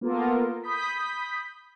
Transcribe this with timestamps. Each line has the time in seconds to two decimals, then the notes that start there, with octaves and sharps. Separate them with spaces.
0.01 A#3 B3 F4 A4 A#4
0.63 B5 D#6 G6 B6